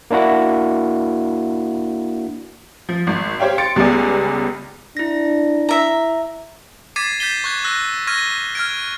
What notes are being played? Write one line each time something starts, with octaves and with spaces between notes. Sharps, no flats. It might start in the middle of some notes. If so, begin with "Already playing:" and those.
A#3 D4 E4 F#4
F3
G#1
G4 C5 C#5 F5 G5
C6 A6 C#7 D7
C#2 G3 B3 D5 G#5
D4 E4 A#6
E5 A#5
D6 G#6 A6 B6 C7 D#7
G6 A6 B6 C7 D#7 G7
C#6 F#6 G#6
E6 F#6 A#6
C#6 F6 G#6 A#6 D#7
F6 G#6 D7